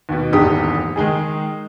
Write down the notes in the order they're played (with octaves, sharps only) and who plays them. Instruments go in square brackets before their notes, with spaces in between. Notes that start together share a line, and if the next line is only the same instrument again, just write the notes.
[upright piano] D#2 B2
D#1 G#1 E2 D3 G4 D#6
D#3 G#3 D#4 G#4